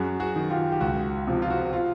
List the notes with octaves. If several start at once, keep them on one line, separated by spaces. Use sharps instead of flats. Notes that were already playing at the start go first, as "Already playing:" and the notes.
Already playing: F#2 F#4 G#4
F#4 G#4
D#3
F4 G4
G4
C#2 F#4
C3 F3
F4
F#4
F4